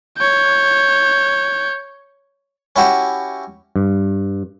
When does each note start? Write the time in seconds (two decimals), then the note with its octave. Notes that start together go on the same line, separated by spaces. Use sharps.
0.18 C#5 G6
2.76 C#4 E4 F#4 G4
3.76 G2